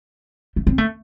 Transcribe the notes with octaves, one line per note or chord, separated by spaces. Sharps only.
A3
C4
A3